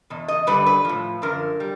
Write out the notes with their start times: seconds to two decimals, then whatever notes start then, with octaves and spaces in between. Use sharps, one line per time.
0.10 E2 B2
0.28 D#5
0.47 G2 D3 G3 B4
0.66 B4
0.85 A2 F3
1.22 F#2 D3 F3 A#4
1.60 G3